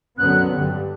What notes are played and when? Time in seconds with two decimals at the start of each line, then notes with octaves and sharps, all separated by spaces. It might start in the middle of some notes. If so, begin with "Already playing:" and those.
0.18 F#2 D3 F#3 B3 F#6
0.49 G2 D3 G3